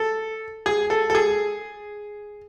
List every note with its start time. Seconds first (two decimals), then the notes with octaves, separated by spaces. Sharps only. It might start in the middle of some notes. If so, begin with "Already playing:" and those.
Already playing: A4
0.66 G#4
0.90 A4
1.10 A4
1.15 G#4